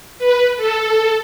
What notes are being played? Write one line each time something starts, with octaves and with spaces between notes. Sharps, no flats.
B4
A4